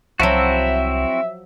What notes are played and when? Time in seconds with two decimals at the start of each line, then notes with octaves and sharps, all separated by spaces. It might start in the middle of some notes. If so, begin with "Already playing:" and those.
0.20 C2 F3 F#3 C4 E4 F#4 E5